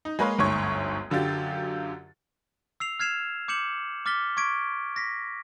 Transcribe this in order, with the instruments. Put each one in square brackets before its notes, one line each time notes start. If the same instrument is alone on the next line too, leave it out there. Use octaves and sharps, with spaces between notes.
[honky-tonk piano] D#4
G#3 A#3 B4 C#5 F5
G1 D2 G#2 C#5 C#6 G#6
F#2 D3 F#3 F4 G4 A6
[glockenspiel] E6 C7 F7
F6 G#6 C7 E7 F7
D6 G6 C#7 E7 F#7
D6 F6 A6 B6 G7
C#6 D6 G#6 B6 D7
A#6 B6